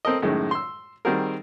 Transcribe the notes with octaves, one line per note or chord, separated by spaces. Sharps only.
C4 A4 A#4 D#5
F#2 A2 D#3 G#3
C6 E6
D#3 G3 C4 F#4 G#4 A#4